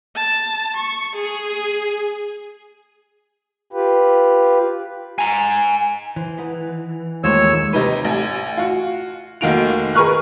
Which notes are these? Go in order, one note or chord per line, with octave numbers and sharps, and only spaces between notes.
A5
C#6
G#4
F4 G4 B4
G#5 A#5
E3 C5
D#4 B4 F#5
D#2 F3 G#3 A3 A#4 C5 C#5 E6
C3 D#4 B4
A1 G#5
F4 F#4
F1 D#3 A#3 F#4 D7 F7
G#4 A#4 B4 C#6 F6 F#6